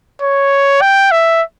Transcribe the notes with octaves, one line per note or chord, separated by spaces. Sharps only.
C#5
G5
E5